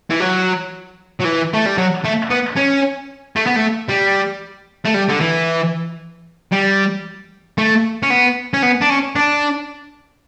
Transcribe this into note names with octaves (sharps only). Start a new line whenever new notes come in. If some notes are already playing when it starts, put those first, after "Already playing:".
E3
F#3
F#3
E3
A3
G3
F#3
A3
B3
C#4
A3
B3
A3
G3
A3
G3
D3
E3
G3
A3
C#4
B3
C#4
B3
D4
C#4
D4